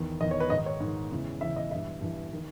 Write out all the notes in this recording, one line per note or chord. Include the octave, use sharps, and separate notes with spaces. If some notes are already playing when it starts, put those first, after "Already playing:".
Already playing: E2 D#3
E2 D#3 D#5
C#5
B4
G#2 D#3 D#5
C#5
G#2 D#3
E2 C#3 E3
E2 C#3 E3 E5
D#5
G2 E3 E5
G2 E3
D#3